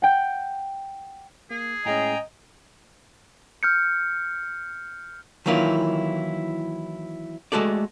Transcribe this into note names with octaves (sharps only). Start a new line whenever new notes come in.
F#5 G5 G6
A#3 G#4
A2 G#3 C#4 D#5 G5 G#5 A#5
F6 G6 C#7
D#3 E3 F#3 A#3 E4 F4
G#3 A3 F#4 A4 D5